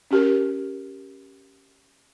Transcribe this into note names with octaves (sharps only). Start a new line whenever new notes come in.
C#4 G4 A#4